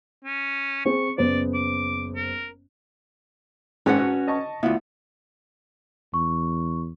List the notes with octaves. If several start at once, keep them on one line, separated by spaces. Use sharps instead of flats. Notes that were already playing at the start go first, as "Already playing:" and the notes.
C#4
C4 G#4 C5 C#6
F#1 B3 C5 D5
D6
A#4
G#1 G#2 C#4 B4 F#5
F#4
D#5 A5 C#6
D2 B3 E4 F4
E2 C#6